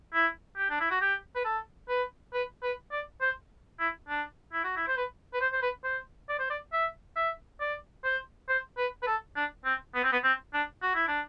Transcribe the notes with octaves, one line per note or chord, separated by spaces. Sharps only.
E4
G4
D4
E4
F#4
G4
B4
A4
B4
B4
B4
D5
C5
E4
D4
E4
F#4
E4
C5
B4
B4
C5
C5
B4
C5
D5
C5
D5
E5
E5
D5
C5
C5
B4
B4
A4
D4
C4
B3
C4
B3
C4
D4
F#4
E4
D4